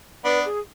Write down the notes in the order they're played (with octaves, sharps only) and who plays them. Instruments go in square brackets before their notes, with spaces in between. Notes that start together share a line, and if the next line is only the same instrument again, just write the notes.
[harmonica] B3 D4 [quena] B4
[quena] G#4